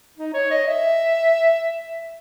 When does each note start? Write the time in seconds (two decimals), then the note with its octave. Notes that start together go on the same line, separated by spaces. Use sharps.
0.18 D#4
0.34 C#5
0.51 D#5
0.67 E5